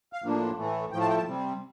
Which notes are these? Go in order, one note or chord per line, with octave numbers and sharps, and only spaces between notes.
F5
A2 F3 A#3 D4
A2 E3 A3
A2 F3 A3 G5
A5
G5
A5
C3 G3 C4